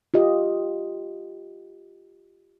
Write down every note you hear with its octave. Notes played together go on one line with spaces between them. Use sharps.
F4 G4 D#5